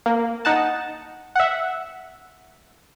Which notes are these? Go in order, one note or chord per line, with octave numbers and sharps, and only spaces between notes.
A#3
D#4 F#5 A5
E5 F#5